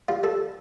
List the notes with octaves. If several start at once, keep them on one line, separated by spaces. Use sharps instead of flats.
G3 F4
G3 A4